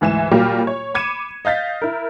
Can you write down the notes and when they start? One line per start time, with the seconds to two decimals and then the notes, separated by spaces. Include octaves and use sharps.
0.01 D2 G#2 E3 G#5 E7
0.31 A#2 F#3 G3 A#3 F4 G4
0.67 C#5
0.94 B5 D6 G#6 C#7 D#7 E7
1.45 D#5 F5 G6 A6 B6
1.82 E4 A#4